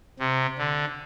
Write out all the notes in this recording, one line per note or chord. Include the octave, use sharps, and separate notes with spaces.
C3
D3